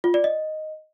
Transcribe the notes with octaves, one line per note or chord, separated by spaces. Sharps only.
F4
D5
D#5